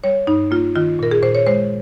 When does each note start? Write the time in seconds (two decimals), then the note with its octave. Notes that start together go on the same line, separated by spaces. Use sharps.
0.04 G3 C#5
0.27 G2 D#4
0.51 A#3 F4
0.75 D#3 F4
0.99 A#2 A#4
1.11 G#4
1.23 A#2 C5
1.35 C#5
1.47 G#3 C5